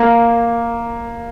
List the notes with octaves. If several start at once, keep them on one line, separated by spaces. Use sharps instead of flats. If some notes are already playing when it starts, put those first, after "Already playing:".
Already playing: A#3